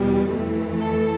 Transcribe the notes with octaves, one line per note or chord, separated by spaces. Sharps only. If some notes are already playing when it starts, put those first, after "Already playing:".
Already playing: E2 B2 G3
F2 E3 A3
A4